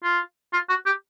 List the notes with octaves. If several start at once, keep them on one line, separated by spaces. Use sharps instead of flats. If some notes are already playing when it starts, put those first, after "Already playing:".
F4
F4
F#4
G4